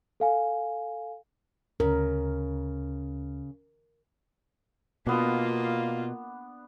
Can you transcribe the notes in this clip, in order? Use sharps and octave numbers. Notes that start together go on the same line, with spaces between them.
A4 F5 G#5
D2 C#3 A#4
B2 A#3 B3 D4 F4